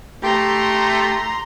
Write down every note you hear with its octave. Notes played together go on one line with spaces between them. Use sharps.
A3 G4 A#5 C6